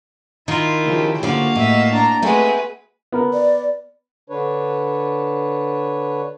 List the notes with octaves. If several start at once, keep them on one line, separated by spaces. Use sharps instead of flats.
D#3 E4 F4
C#3 F3 G4
D3 F3 A#3 F#4 F5
A2 D#5 E5
D4 A#5
G#3 A3 C4 F#4 G#4 B4
B3 A#4
D5
D3 D4 B4 C#5